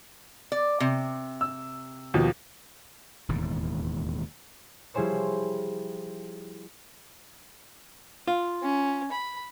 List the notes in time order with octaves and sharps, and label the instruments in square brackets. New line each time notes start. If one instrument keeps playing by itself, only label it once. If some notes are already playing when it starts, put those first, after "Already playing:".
[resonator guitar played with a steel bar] D5
C3
[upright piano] E6
D#2 B2 F3
[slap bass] E1 D#2 A2
[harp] F3 G3 E4 G#4 C5 C#5
[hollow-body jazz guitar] F4
[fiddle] C#4
B5